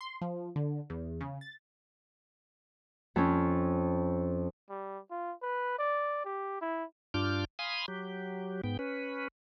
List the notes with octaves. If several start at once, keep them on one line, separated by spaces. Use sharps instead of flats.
C6
F3
D3
E2
C#3
A6
F2 C#4
G3
F4
B4
D5
G4
E4
G2 D4 F4 D6 F6 G6
F5 G#5 B5 C6 D#6
F#3 G4
G#2 B3 G5
C#4 B4